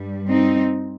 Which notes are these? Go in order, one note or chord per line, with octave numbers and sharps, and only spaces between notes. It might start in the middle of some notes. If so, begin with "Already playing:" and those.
Already playing: G2 G3
C4 D#4